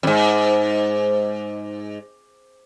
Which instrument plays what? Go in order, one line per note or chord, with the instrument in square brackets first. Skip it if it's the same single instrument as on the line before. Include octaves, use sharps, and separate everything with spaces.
[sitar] F2 G#2